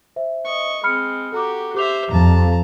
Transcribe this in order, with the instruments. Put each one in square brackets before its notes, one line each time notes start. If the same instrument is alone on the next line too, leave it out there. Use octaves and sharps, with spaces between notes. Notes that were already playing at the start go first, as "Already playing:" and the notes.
[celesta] C5 E5
[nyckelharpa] D#5 C#6
[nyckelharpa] G#3 C4 [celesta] B5 F6 C#7
[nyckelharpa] F#4 G4 [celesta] A4 A#5 D6
[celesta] G4 D6 F7 [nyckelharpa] C5 E5
[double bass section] F2 [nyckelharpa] A5 A#5